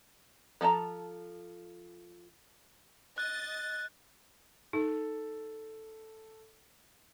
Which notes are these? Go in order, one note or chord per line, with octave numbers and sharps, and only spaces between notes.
F3 A4 A5 A#5
D#5 F#6 A6
D#4 A4